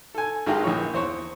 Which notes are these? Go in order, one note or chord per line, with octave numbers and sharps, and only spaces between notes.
A4 G#5
G#1 G#3 D#4 F4 G4 G5
A#1 E3 F3 C#5
E2 C5 C#5